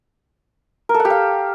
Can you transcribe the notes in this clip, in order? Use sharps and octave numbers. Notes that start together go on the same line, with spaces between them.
A#4
A4
F#5
G4
F5